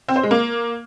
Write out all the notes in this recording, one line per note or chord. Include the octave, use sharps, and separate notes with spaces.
C4
C5
G#3
A#3